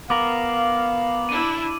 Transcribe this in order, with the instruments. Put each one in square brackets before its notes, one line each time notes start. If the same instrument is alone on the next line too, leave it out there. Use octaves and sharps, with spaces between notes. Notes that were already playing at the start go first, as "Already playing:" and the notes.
[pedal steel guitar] B3 A#4 [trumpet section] F5 [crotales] D6 F#7
[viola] D4 E4 [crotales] D#7